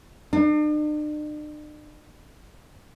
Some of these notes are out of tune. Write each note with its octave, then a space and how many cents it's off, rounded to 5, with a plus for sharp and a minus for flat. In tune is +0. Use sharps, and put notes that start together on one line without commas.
D4 +45